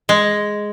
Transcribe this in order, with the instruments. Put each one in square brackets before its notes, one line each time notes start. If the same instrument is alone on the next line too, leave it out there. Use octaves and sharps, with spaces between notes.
[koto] G#3